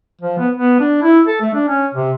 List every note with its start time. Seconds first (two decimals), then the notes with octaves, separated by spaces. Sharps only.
0.21 F3
0.38 B3
0.55 B3
0.79 D4
1.02 E4
1.27 A4
1.41 A3
1.54 D4
1.68 C#4
1.94 C3